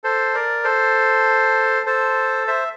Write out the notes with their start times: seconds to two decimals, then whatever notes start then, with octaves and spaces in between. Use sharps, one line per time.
0.04 A4 C5
0.34 A#4 D5
0.64 A4 C5
1.86 A4 C5
2.47 C5 E5